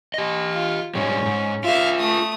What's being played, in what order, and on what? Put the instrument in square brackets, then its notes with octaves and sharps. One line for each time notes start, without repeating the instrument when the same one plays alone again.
[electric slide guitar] G4 D#5
[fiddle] F4
[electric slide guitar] G#2 G3 G#3 [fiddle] C#4
[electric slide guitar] G#2
[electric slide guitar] F4 G#4 [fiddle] E5 F5
[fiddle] A3 D#6